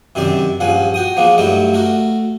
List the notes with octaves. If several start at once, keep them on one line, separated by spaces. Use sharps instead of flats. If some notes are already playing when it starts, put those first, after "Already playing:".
F#2 C3 D#3 C4 D5
A#1 G2 F3 C#4 F#5
F#4 G5 D#6
F3 G#3 A#3 B3
G2 F#3 G3 A3 D#4
A3 F#4 A#4